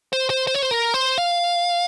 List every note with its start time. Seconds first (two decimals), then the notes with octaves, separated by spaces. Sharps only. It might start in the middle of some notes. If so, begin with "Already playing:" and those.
0.13 C5
0.30 C5
0.47 C5
0.55 C#5
0.62 C5
0.71 A#4
0.94 C5
1.18 F5